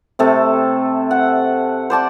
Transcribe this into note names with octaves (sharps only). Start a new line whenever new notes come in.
C3 A3 A4
F#5
C5 D5 A5 D6